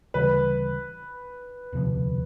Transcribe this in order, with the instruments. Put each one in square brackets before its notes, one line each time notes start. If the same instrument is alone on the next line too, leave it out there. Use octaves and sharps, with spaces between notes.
[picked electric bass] D2 C#3 E3 G3 [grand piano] B4
[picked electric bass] E1 D2 C3 F3